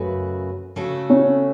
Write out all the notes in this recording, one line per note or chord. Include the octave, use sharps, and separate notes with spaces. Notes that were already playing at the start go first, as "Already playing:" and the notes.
Already playing: F#2 C#3 A3 F#4 B4
C#3 A3 F#4 A4
C#4